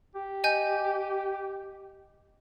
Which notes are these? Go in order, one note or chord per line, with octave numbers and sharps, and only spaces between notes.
G4
D#5 G#5 G6